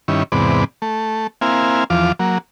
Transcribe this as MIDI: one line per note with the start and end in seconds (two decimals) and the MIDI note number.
0.08 0.23 43
0.08 0.23 51
0.08 0.23 61
0.08 0.23 64
0.32 0.64 40
0.32 0.64 44
0.32 0.64 48
0.32 0.64 59
0.32 0.64 74
0.82 1.27 57
1.41 1.84 58
1.41 1.84 60
1.41 1.84 64
1.41 1.84 77
1.41 1.84 80
1.90 2.12 40
1.90 2.12 53
1.90 2.12 65
1.90 2.12 86
2.20 2.38 54
2.20 2.38 58